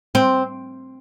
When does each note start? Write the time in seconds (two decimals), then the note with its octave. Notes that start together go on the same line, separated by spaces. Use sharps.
0.15 C4